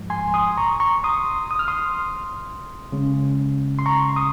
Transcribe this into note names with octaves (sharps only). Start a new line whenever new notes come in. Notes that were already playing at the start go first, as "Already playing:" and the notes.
Already playing: G#2 F3 G#3
G#5 C6
C6 D#6
A#5 C#6
A#5 C#6
C6 D#6
D#6
F6
C6 D#6
C#3 G#3 C#4
C6
A#5 C#6
C6 D#6